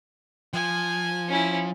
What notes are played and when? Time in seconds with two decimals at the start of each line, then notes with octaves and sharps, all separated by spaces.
0.54 F3 G#5
1.28 C#4 E4